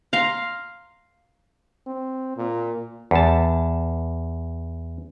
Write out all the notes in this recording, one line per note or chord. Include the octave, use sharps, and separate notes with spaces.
F5 A#5 C6
C4
A#2
E2 A5